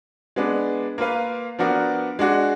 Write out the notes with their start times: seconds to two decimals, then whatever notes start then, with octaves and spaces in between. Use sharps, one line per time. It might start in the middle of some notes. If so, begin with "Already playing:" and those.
0.36 G#3 B3 D4
0.98 A#3 F4 B4 F5
1.59 F3 B3 D4 F#4 A#4
2.19 G#3 D4 F#4